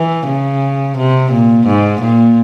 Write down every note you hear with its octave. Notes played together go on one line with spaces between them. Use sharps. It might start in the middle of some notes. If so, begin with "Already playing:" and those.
Already playing: E3
C#3
C3
A#2
G#2
A#2